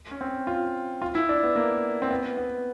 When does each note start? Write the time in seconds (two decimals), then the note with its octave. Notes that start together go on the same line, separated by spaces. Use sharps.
0.11 C#4
0.21 C4
0.47 F4
1.02 F4
1.15 E4
1.29 D4
1.43 B3
1.56 A#3
2.02 C4
2.11 B3
2.37 B3